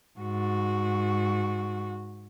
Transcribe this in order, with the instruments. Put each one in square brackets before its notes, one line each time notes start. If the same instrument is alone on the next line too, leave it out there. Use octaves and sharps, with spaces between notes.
[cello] G#2 F#4